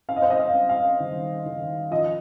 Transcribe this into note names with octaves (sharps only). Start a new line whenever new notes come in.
C4 F5
D#5
C5
D#5
F5
C4
F5
D#3
D#3
F3 D#5